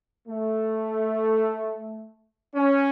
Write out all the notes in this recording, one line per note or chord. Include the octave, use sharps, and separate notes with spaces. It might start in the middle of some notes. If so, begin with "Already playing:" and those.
A3
C#4